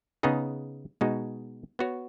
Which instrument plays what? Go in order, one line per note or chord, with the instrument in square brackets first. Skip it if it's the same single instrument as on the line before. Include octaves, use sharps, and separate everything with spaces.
[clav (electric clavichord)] C#3 B3 D#4 G#4
B2 G#3 D#4 F#4
B3 F#4 C#5